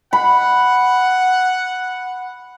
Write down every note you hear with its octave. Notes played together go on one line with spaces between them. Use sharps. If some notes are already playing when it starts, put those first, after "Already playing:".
F#5 B5